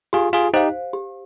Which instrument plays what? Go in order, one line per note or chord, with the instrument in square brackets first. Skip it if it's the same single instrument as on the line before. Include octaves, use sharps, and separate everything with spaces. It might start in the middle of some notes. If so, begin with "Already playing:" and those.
[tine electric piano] F4 G#4 [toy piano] G4
[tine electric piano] F4 G#4
[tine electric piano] D#4 G4 [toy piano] C5 F5
[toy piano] G4